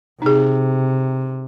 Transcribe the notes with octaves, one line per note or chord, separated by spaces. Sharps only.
C3 D#4 G#4